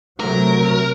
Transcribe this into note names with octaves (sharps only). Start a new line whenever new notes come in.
C3 F#3 A3 A#4